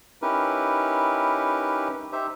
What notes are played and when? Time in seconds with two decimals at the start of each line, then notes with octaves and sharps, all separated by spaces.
0.22 C#4 D#4 E4 G4 A#4 B4
2.12 D#4 G4 C5 E5